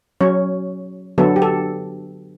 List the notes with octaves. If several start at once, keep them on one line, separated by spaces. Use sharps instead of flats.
F#3 C#4 C#5
D3 F#3 B3 A4
G4
A4